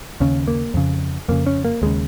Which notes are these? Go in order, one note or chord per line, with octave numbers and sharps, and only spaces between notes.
D#2 C#3 C#4
A#3
F2 C#3
F2 C#3 A#3
C#4
A#3
D#2 C#3 G#3